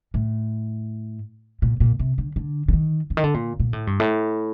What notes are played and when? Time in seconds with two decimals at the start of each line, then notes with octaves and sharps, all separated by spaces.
0.14 A2
1.62 A#2
1.80 A#2
1.99 C3
2.18 D3
2.36 D3
2.68 D3
2.73 D#3
3.10 D3
3.17 D#3
3.24 D3
3.34 A#2
3.60 A#2
3.73 A2
3.87 G2
4.00 A2